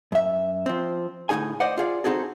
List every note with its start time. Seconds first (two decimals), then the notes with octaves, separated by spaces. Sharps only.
0.12 F#2 E5
0.66 F3 C4
1.29 D2 A2 D#3 D#4 G#4 G#5
1.60 C5 D5 D#5 F#5
1.78 F4 G#4 D5
2.04 C4 D#4 F#4 G#4 A4